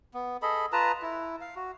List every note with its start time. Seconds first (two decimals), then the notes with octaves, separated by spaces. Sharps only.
0.14 B3
0.42 G#4 A4 D#5 B5
0.73 F4 B4 A5 A#5
1.02 E4
1.41 F5
1.56 F#4